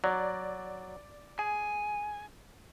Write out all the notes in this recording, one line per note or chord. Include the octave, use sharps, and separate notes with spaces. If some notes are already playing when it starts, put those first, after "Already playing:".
F#3 D5
G#4 G#5